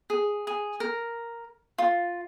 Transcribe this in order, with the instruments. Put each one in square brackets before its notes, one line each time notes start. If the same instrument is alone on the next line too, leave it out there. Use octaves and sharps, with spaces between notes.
[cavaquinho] G#4
G#4
A#4
F4